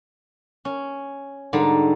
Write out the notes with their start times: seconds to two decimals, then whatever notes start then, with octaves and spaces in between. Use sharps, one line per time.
0.65 C#4
1.53 G#2 D3 G3